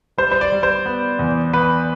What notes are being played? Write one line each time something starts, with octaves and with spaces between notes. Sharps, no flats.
G3 C5
C5
D5
G3
C5
B3
E2
B3 B4